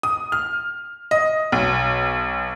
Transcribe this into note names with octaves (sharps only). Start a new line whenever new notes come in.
D#6
F6
D#5
B1